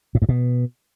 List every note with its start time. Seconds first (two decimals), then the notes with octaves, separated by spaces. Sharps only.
0.15 A2
0.22 G2
0.29 B2